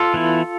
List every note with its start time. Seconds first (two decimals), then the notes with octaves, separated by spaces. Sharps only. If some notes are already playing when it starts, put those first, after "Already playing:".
Already playing: F4 A4
0.14 E3 B3 E4